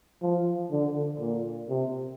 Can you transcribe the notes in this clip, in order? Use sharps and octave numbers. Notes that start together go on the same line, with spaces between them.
F3
D3
A#2
C3